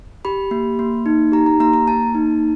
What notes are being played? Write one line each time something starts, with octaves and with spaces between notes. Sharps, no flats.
G4 B5
A#3
A#3
D#4
G4 A#5
A#5
A#3 A#5
A#5
A#3 A5
D#4